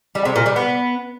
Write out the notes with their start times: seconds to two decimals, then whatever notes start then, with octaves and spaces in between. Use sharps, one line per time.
0.15 G3
0.25 C3
0.36 A#2
0.46 G3
0.56 B3